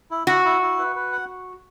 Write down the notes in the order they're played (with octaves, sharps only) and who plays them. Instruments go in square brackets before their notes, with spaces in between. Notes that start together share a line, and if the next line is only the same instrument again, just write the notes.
[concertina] E4
[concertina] E4 [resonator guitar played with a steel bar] F#4
[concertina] E4
E4
B4
B4
F#5